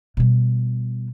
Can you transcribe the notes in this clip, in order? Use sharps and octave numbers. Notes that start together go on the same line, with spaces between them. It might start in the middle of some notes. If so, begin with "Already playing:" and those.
B2 G3